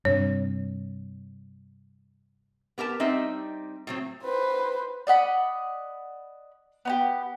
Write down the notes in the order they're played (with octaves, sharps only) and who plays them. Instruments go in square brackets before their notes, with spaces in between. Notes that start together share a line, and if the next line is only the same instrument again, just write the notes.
[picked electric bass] G2 C3 [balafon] C#5
[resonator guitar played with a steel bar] B3 G4 A#4 A5
G3 C4 D#4 D#5 E5
A2 F#3 C4
[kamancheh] B4 C5
[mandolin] D5 D#5 F#5 B5
B3 D#4 G4